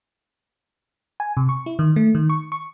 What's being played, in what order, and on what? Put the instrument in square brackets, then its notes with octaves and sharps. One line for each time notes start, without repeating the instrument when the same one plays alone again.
[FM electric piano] G#5
C3
C#6
E4
D#3
A3
D#3
C#6
C#6